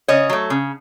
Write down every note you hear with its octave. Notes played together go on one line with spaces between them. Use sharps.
C#3 C#5 D#5
F#3 A3
C#3